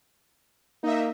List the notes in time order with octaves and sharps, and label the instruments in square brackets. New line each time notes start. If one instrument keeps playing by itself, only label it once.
[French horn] A#3 [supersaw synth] D#4 D#5 E5